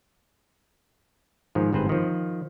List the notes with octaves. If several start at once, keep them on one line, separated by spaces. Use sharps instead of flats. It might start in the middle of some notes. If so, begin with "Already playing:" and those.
G#2 D#3 F3
G1 G#2 C4 B4 C5
D#3 F3